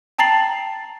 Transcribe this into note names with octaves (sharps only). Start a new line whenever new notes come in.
G5 A5 A#5 A6 C7 F#7